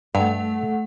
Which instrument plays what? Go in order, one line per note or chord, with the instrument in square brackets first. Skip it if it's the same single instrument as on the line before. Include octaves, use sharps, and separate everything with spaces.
[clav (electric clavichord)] G2 [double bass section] A3 [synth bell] F#5